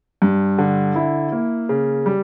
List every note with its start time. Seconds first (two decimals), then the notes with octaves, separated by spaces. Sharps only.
0.22 G2
0.59 D3
0.96 E4
1.32 A#3
1.69 C#3
2.06 G3